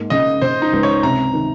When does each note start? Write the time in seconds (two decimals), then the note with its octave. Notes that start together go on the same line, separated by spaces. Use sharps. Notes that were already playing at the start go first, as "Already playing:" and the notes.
Already playing: G#2 A#3
0.10 C#3 D#5
0.42 C#3 C5
0.62 D#4
0.73 C#2
0.83 C#5
1.03 C3 A#5
1.34 D#3